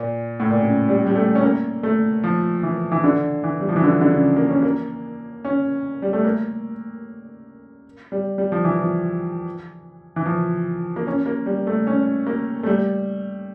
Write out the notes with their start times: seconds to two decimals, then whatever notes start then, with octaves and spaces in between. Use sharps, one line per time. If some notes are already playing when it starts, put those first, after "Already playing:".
Already playing: A#2
0.40 A2
0.51 A#2
0.63 C#3
0.89 G3
1.07 G3
1.15 A3
1.35 C#4
1.43 A#3
1.83 A3
2.24 F3
2.63 E3
2.92 E3
3.04 D3
3.44 E3
3.60 G3
3.69 F3
3.76 E3
3.84 D3
4.01 D3
4.11 C#3
4.37 A#3
4.49 C#4
4.63 A#3
5.45 C#4
6.02 G3
6.13 A3
6.25 A#3
8.12 G3
8.38 G3
8.52 F3
8.64 E3
8.78 F3
10.16 E3
10.26 F3
10.96 A#3
11.07 C#4
11.26 A#3
11.46 G3
11.67 A3
11.87 C#4
12.27 A#3
12.63 A3
12.66 G3